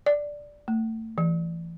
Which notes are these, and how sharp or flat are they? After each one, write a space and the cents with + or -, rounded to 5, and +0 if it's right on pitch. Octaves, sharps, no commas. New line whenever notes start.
D5 +0
A3 +30
E3 +25